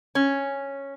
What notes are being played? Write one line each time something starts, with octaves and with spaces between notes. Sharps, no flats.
C#4